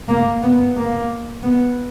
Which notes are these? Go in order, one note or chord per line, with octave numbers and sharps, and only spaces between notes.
A#3
B3
A#3
B3